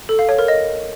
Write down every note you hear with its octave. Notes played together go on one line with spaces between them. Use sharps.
A4
F5
C#5
A#4
D#5